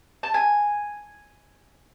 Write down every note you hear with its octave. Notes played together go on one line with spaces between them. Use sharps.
A5
G#5